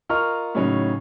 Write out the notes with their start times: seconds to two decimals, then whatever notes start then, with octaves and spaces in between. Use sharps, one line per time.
0.09 F4 A#4 D#5 A#5 C#6 F6
0.55 A2 C#3 F#3 C#4 D#4